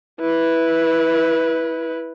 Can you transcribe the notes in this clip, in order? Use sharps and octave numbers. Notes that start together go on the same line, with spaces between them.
E4 B4